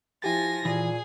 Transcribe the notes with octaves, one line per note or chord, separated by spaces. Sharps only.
F3 E4 G4 G#5 A6 A#6
A#2 E3 G#4